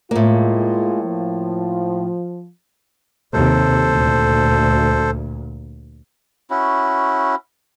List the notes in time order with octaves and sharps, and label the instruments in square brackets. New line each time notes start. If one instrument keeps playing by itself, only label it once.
[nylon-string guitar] A2 A#3 [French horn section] G#3 F4
[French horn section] F3
[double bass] D#2 C3 [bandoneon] A4 C5
[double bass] D2 A#2
[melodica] C#4 E4 F#4